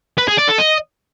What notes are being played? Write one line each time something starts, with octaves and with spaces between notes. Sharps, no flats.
B4
G#4
D5
A4
D#5